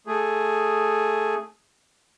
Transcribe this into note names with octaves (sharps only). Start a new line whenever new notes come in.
A3 G#4